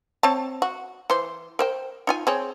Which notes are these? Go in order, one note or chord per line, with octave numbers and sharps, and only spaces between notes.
C4 C#5 A5
F#4
E3 C5
A#4 C5 G5
D#4 F4 G#5
C4 G#4 C#5